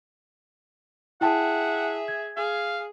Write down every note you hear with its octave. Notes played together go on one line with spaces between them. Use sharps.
E4 G#4 E5 F#5 G5 A5
G#6
G#4 F5